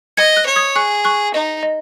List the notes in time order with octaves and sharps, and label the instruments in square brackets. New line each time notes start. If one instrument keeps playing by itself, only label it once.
[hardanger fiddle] D#5 [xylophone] G#6 C#7
[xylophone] F#6 A#6
[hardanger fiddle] C#5
[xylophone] D#6 G#6
[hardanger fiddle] G#4 [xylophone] C#6 F#6
[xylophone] C#6 F#6
[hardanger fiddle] D#4 [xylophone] D#5
[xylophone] D#5